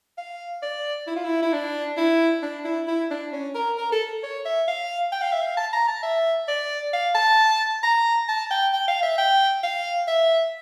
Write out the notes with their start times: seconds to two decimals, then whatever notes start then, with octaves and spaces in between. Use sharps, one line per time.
0.18 F5
0.62 D5
1.07 E4
1.16 F4
1.24 E4
1.43 E4
1.53 D4
1.97 E4
2.42 D4
2.65 E4
2.88 E4
3.11 D4
3.33 C#4
3.55 A#4
3.78 A#4
3.92 A4
4.23 C#5
4.45 E5
4.68 F5
5.12 G5
5.22 F5
5.32 E5
5.42 F5
5.57 A5
5.73 A#5
5.88 A5
6.03 E5
6.48 D5
6.93 F5
7.15 A5
7.83 A#5
8.28 A5
8.51 G5
8.73 G5
8.88 F5
9.03 E5
9.18 G5
9.63 F5
10.08 E5